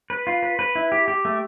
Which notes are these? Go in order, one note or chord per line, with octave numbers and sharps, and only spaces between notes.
B4
F4
B4
B4
E4
G4
G4
A3